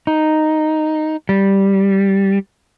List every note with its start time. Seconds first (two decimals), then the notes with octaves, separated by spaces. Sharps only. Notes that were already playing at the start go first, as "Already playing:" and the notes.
0.07 D#4
1.29 G3